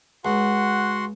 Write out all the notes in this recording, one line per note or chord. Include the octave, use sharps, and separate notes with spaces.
C#2 F#4 F#5 C6